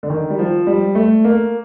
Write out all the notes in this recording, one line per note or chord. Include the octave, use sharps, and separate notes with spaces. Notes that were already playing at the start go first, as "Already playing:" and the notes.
D3
D#3
G3
F3
G3
A3
A#3